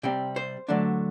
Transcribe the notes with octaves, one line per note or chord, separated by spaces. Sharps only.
C3 G3 C4 G5
C5
D3 F#3 A3 D4